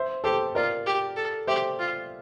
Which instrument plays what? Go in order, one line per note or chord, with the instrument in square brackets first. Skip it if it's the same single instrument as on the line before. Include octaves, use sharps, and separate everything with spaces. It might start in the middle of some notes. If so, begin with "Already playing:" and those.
Already playing: [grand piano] C5 E5
[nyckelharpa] G4 [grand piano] A4 C5
[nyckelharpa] F4 [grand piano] A#4 D5
[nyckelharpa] G4
A4
[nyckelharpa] G4 [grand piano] C5 E5
[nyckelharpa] F4